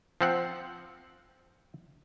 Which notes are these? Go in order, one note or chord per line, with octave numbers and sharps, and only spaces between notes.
F3 C4 F#5